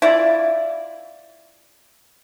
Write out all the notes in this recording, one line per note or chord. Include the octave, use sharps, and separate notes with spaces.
E4 F4 D5